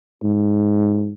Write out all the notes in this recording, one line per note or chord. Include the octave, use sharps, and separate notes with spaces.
G#2